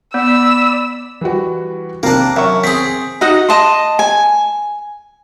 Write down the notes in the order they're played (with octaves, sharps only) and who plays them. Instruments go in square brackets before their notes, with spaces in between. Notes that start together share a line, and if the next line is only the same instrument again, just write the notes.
[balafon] B3 F#5 [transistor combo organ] D5 B5 [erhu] E6
[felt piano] E3 G3 F#4
[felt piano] C3 [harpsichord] A#3 D4
[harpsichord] F#2 [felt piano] E5 C#6
[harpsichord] C4 G#4 [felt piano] B6
[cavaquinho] D#4 F#4 D#5 F#5
D#5 A5 C6
G#5